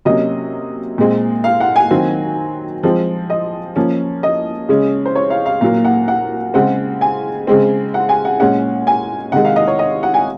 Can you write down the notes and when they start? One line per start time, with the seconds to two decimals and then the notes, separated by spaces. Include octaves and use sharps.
0.05 C3 F#3 A#3 C#4 D#5
0.98 A#2 G#3 C4
1.44 F5
1.60 F#5
1.76 G#5
1.91 D#3 F#3 C4
2.83 F3 G#3 C4
3.30 D#5
3.76 F3 A#3 C#4
4.23 D#5
4.69 C#3 G#3 C#4
5.05 C5
5.15 C#5
5.30 F5
5.46 F5
5.61 A#2 F#3 A#3 F5
5.85 F#5
6.08 F#5
6.54 C#3 G#3 C4 F#5
7.01 G#5
7.47 C#3 G#3 C4
7.94 F#5
8.09 G#5
8.25 F#5
8.40 A#2 G#3 C#4 F#5
8.87 G#5
9.32 C3 D#3 G#3 F#5
9.45 F5
9.56 D#5
9.68 C#5
9.79 D#5
10.03 F#5
10.14 G#5